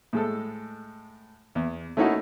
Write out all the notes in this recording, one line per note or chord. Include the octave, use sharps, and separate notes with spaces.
A2 G#3 A4
E2
A3 A#3 C#4 D#4 E4 F#4